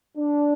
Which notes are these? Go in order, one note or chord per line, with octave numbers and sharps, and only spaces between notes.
D4